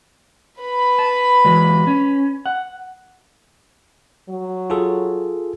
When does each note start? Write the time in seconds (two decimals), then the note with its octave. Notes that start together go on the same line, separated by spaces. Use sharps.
0.59 B4 B5
0.99 A5
1.45 E3 F#3 G#3
1.87 C#4
2.46 F#5
4.30 F#3
4.70 F4 G#4 A4